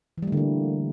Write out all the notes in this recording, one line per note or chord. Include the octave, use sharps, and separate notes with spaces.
D3 E3 G3 A3 A#3